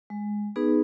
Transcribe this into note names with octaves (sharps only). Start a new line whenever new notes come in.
G#3
B3 D#4 G#4 B4